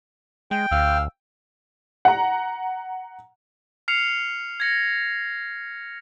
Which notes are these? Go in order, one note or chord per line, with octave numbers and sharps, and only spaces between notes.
G#3 G5
D2 F5 E6
F#5 A#5
F6 C7 C#7 F7
G#6 A#6 C#7